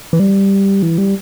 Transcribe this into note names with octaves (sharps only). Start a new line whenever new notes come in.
E3
G3
E3
G3